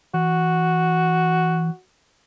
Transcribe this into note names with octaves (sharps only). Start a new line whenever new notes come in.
E3 F#4